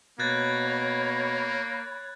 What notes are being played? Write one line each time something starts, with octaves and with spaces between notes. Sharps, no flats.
B2 A#3 C#5 B5 F#6 G#6 A6